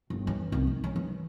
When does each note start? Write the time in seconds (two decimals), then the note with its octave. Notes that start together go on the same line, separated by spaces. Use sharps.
0.10 G1
0.27 E3 C#4
0.52 C2
0.67 D#3
0.84 C#4
0.96 E3